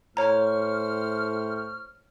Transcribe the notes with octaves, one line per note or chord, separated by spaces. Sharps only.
A2 C5 C#5 A#5 C#6 F6